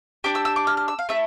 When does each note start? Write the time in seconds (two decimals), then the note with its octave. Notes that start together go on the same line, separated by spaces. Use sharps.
0.24 D4 G4 D6
0.35 E6
0.45 E6
0.56 D6
0.67 F6
0.77 F6
0.88 E6
0.99 F5
1.09 A3 E4 A4 E5